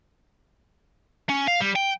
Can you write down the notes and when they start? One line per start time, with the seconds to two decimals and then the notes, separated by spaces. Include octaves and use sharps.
1.29 C#4
1.48 F5
1.61 G3
1.76 G5